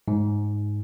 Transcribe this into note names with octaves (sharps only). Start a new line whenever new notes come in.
G#2